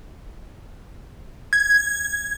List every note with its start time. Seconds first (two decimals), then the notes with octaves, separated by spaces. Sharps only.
1.53 G#6